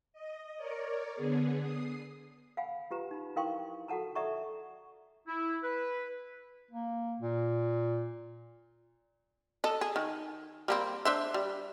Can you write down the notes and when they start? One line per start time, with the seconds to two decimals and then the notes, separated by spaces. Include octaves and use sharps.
0.13 D#5
0.57 A#4 C#5 D5
1.14 D3 B3 G#4
1.59 D#6 C7
2.57 F5 F#5 G#5 B5
2.91 F4 G4 B4 A#5
3.11 D#4 B5
3.36 E4 A#4 F5 G5 C6 C#6
3.88 F#4 A4 F#5 A5 A#5
4.15 A4 D5 E5 F#5 A#5 C#6
5.28 E4
5.63 B4
6.71 A#3
7.21 A#2
9.64 A4 D#5
9.81 G#4
9.96 D#3
10.68 G3 A#3 C4
11.05 D4 C5 E5
11.34 G3